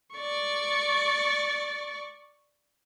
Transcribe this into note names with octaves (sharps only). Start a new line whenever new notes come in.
D5 C#6